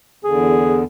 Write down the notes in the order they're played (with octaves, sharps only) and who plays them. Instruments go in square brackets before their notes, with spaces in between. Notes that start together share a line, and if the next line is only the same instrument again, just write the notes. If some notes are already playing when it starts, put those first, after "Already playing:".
[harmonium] E2 D3 [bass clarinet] G#4